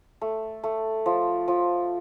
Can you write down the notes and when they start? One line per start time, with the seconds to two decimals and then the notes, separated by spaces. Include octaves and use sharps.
0.21 A3
0.63 A3
1.06 F3
1.48 F3